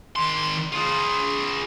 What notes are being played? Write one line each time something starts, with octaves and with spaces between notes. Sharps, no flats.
D#3 C6
F4 G#4